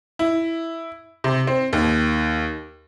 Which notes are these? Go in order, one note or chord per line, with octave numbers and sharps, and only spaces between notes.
E4
C3
C4
D#2